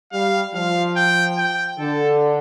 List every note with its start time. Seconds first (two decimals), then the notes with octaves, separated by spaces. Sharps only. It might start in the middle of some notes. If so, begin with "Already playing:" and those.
0.12 G3 F5
0.54 F3 F5
0.96 G5
1.38 G5
1.79 D3 A4